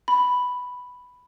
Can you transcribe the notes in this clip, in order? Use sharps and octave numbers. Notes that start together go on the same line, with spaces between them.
B5